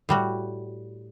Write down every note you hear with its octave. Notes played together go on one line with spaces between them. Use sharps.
A2 G3 F#4